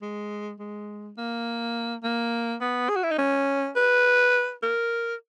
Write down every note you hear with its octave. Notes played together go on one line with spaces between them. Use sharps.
G#3
G#3
A#3
A#3
B3
G#4
F#4
E4
D#4
C#4
B4
A#4